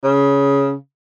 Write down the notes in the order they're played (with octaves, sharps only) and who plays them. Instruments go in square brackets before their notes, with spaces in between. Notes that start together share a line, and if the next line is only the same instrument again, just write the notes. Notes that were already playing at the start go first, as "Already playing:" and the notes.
[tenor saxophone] C#3